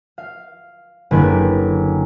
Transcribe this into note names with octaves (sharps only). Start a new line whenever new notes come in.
F5
F#1 D3 A#3 B4 G#6